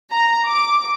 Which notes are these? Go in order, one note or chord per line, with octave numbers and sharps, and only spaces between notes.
A#5
D6